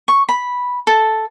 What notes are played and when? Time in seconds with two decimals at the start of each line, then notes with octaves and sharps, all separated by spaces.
0.08 C#6
0.29 B5
0.87 A4